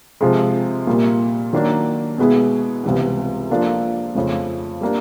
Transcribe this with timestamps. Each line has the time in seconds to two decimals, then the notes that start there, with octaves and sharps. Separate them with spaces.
0.21 C3 F3 G#3
0.87 A#2 G3 A#3
1.53 D#3 F#3 A#3 D4
2.18 B2 G#3 B3 E4 G#4
2.84 C#2 C3 E3 G3 B3
3.50 F3 A#3 D4 F4 A4
4.15 F2 C#3 F3 A3
4.81 G3 A#3 D4